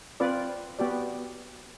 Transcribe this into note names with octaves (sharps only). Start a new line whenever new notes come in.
C4 F4 B4 D5
B3 F#4 G4 D5